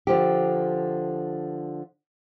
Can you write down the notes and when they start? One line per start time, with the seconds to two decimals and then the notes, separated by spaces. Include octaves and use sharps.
0.07 D3 F3 G4